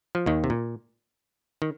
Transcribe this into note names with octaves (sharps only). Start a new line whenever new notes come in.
F3
D#2 D#3
C3
A#2
D#3